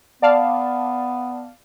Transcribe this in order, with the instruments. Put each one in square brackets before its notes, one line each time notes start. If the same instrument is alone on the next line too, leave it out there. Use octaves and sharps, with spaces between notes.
[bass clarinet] B3 [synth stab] D5 F5 A5